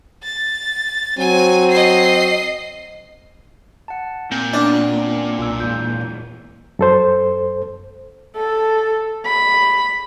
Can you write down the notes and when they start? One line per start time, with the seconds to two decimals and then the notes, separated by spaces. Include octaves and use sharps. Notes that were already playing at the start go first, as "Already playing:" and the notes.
0.23 A6
1.19 F#3 C4 G#5
1.70 D#5 C7
3.88 F#5 A5
4.32 A#2 C4 G6
4.54 B3 C#4 D4
5.39 B1 F4 E6
5.60 E2 G#2 E3 G6
6.79 F#2 A4 C5
8.37 A4
9.26 B5